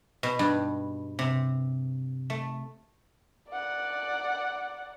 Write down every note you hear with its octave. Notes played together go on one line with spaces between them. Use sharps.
B2
G2
C3
A3
D5 F#5